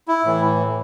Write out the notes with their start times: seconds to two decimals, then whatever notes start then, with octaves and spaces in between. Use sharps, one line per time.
0.08 E4
0.24 A2 E3